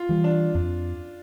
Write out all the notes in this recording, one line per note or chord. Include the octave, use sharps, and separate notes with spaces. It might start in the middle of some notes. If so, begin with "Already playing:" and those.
Already playing: F4
E3 G3
D4
F2 D4